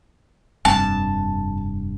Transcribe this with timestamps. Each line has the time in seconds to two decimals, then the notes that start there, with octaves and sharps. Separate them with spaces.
0.65 F1 G2 C4 A5